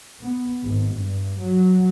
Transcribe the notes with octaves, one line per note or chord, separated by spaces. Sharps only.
B3
G#1
G2
F#3